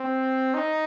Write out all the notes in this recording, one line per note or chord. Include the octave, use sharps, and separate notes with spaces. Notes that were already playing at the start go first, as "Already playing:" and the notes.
Already playing: C4
D#4